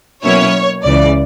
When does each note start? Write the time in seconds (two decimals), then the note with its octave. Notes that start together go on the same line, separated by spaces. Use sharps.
0.24 B2 F#3 A#3 C#4 E4 C#5
0.83 C#2 C#3 E3 D5